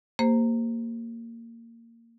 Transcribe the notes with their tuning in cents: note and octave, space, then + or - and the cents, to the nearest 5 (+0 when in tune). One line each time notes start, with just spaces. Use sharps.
A#3 -15 G4 +45 C5 +0